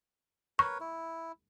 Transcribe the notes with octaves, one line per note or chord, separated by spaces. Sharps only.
A#4 B4 C#5 C#6
E4